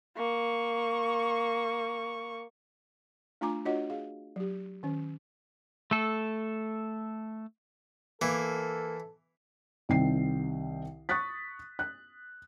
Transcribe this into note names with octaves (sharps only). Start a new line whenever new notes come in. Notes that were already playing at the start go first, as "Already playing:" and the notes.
A#3 C#6
A3 D4 F4 G#5 A#5 D6
D4 F4 F#4 C#5 D#5 F#5
G#4 F5
F#3 G4
D#3 C#4
A3 A4
E3 A#3 A4
C2 D#3 C4 G5 C7
C#6 D#6 F#6 A6 B6
F#6